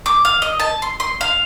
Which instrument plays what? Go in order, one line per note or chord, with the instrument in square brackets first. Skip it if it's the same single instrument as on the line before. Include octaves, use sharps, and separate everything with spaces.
[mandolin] D6
F5
D#5
A5
C6
C6
F5